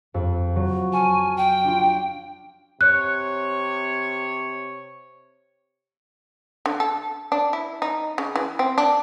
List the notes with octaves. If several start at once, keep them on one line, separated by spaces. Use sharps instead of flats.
F2
F#3
G#5 A5 C#6 F6
G5
D4 F4
C3 C#5 F#6
D3
A4
D4
E4
D#4
C#3
E3
C4
D4